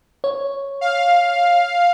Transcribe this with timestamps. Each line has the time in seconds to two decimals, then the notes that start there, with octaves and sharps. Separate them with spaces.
0.24 C#5
0.81 F5